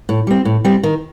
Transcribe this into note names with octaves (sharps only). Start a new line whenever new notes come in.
A2
G3 C4
A2
G3 C4
D#3